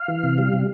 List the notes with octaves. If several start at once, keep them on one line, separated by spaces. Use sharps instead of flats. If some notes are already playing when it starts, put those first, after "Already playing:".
Already playing: F5
E3
C3
G3
C3